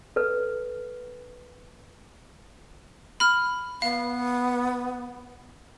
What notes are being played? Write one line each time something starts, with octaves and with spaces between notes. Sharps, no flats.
A4 B4
B5 F6
B3 F5